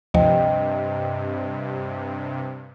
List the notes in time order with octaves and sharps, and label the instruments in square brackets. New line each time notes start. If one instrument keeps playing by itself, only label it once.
[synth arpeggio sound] D2 F3 [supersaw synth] G2 C3 [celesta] D#5 G5